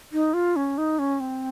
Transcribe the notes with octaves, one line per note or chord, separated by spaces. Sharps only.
D#4
F4
C#4
D#4
C#4
C4